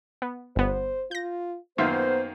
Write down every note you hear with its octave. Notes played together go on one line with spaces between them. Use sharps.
B3
G1 B3 C5
F4 G6 A#6
F#2 D#3 A#3 B3 F4 C5 E5